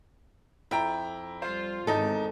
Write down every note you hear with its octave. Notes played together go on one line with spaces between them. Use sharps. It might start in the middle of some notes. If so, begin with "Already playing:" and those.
F2 E4 G5 A#5
G3 F4 C5
G#1 E2 D#4 A4